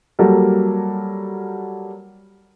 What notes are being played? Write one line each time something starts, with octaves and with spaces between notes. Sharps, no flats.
F#3 G3 A#3 G4 A4 A#4